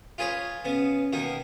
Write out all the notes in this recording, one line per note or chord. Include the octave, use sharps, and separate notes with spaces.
F4 G#4 B4 C#5
C#3 B3
B2 D#3 A#3